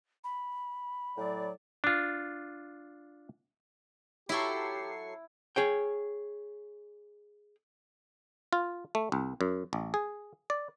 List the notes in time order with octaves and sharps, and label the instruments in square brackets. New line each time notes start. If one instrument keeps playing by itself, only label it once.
[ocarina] B5
[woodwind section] A2 F#3 D5
[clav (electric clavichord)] D4 F4
[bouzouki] F#3 A4 [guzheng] E4 [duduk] G4 [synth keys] C#6 C7
[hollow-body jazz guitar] G#4 C#5 G5
[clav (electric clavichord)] F4
A3
C2
F#2
A1
G#4
D5